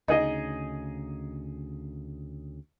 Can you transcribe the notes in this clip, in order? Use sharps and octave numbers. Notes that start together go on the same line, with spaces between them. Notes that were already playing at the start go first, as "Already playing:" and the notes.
D2 C#3 D#4 G#4 D#5